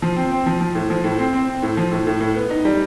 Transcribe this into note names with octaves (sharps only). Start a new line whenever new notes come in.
F3
C4
C4
F3
F3
A2
F3
A2
C4
C4
C4
A2
F3
A2
A2
A2
B3
D#4
G3